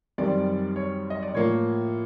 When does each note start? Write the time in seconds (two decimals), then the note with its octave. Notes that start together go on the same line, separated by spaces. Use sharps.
0.18 F#2 D#3 G3 C4 D5
0.76 C#5
1.10 D#5
1.23 D5
1.34 A2 F3 A#3 C#5